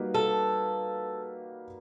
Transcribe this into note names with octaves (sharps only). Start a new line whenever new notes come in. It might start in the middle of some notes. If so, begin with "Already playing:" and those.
Already playing: G3 A#3 D#4 F#4 B4
A4